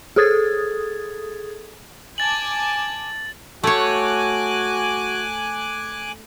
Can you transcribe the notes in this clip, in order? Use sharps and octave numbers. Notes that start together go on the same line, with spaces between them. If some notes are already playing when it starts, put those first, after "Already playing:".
G#4 A4 D#6 G#6 A6
G#5 A5 D6 A6 F#7
A3 F#4 C#5 G#5 D6 F#6